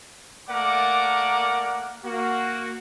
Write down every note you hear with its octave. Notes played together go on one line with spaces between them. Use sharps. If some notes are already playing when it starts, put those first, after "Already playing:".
A3 A#3 A#4 D5 F#5 D6
A#3 F#4